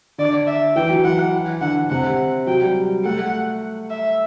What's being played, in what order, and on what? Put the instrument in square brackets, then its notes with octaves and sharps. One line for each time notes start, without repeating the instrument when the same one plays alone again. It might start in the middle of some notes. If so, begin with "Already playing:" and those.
[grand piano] D3 [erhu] D5
[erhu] E5
[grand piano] E3 [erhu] G5
[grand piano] F#3
[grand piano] E3 [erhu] F#5
[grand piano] D3 [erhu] F#5
[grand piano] C3 [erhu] F#5
[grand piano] F#3 [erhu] G5
[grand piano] G3
[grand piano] A3 [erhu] F#5
[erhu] E5